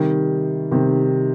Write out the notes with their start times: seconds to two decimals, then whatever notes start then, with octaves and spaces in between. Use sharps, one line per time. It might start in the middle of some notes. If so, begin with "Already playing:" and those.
Already playing: C3 D#3 G3
0.71 C3 D#3 G3